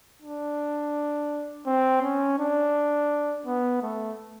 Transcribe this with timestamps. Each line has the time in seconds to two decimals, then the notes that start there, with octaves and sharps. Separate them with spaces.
0.22 D4
1.66 C4
2.02 C#4
2.39 D4
3.46 B3
3.83 A3